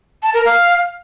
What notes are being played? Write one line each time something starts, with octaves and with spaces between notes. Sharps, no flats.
A5
A#4
F5